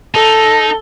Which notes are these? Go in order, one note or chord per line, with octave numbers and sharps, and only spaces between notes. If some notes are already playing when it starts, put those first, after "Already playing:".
D#4 A4